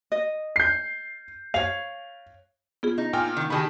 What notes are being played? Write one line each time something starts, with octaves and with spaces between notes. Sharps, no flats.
D#5
G6 C7
C#5 F5 F7
B3 F4 G#4
D#4
A#2 G5 G#5 F6
D#3
B2 D#3 G4 G#4 A5 B5